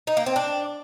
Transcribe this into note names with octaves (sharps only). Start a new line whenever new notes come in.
D#4
A#3
C4
D4